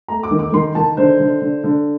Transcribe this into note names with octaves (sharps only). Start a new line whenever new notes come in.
A3 A#5
D6
D#3
D6
D#3 C6
D#3 A5
D3 C5
D3
D3
D3